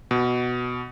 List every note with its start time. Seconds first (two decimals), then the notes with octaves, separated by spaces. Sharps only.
0.11 B2